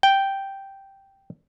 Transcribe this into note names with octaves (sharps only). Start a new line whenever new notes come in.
G5